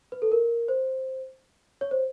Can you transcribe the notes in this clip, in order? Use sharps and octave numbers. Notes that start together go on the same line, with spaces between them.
B4
A4
A#4
C5
C#5
C5